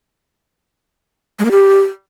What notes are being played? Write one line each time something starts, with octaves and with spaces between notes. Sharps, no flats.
G#3
A#3
G4